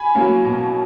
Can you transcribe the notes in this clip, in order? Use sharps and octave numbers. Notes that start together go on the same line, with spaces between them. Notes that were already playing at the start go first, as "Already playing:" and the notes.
Already playing: G#5 B5
F#3 A#3 C#4
B2